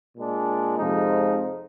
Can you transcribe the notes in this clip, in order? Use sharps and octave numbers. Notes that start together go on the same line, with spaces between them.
A#2 G#3 D4
F2 C3 F3 G#3 D#4